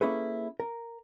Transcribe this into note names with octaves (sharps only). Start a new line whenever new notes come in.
A#3 C#4 E4 G#4 A4 B4
A#4